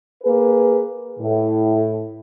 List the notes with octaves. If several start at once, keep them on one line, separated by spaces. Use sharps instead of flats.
A#3 G#4 B4
A2